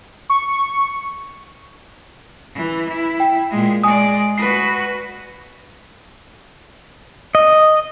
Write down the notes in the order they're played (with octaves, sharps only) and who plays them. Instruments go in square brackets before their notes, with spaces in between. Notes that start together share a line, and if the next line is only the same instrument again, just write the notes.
[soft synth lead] C#6
[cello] E3
E4
[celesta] G5
[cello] A#2 G#3
[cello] G#3 D5 [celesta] G#5 D#6
[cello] F#4 B4 [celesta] C7
[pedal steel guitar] D#5